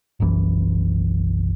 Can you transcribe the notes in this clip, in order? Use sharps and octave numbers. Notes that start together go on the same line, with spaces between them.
F#1 B1 F#2 E3